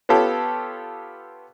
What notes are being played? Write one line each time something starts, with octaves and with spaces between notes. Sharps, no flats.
B3 F4 G4 A4 C#5 G5